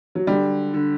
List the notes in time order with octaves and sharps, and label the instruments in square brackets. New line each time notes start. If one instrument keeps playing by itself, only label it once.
[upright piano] F#3
[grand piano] D3 [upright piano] G3
[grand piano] D3